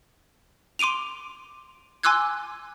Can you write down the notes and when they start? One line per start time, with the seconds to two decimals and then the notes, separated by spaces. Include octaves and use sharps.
0.79 C6 D6 D7 D#7 F7
2.03 G#5 C6 D6 E6 F#6 G#6